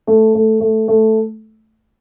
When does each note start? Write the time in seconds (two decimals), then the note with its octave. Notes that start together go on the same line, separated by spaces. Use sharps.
0.07 A3
0.35 A3
0.60 A3
0.88 A3